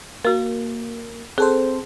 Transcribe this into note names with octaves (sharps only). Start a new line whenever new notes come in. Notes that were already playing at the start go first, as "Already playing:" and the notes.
A#3 F#4 A#4
C4 G#4 A4 C5